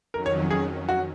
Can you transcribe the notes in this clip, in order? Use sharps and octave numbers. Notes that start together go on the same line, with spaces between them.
F2 D#3 F#3 C#4 A#4
C#5
G#4
F#4